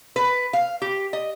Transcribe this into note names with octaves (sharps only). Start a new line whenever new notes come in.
B4
F5
G4
D#5